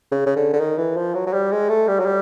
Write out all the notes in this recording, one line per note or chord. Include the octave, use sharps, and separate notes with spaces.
C#3
C#3
D3
D3
D#3
E3
F3
F#3
F#3
G3
G#3
A3
G3
F#3
G3